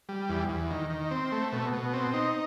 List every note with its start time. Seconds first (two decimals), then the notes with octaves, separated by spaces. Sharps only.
0.09 G3
0.29 E2
0.49 E2
0.71 D#3
0.90 D#3
1.11 C4
1.32 A3
1.52 B2
1.73 B2
1.93 C4
2.14 D#4